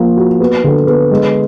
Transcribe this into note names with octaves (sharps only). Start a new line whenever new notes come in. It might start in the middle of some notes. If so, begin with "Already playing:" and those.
Already playing: F3 A#3
F#4
B3
D3
B3
G#3